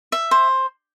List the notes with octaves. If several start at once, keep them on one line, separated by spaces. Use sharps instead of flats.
E5
C5